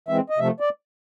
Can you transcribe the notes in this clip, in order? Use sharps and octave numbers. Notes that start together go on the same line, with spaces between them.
E3 G#3 C4 E5
D#5
C3 F3 A3 E5
D5